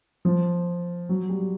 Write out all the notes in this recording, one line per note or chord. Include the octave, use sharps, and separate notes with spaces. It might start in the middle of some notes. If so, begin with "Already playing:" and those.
F3
F#3
G3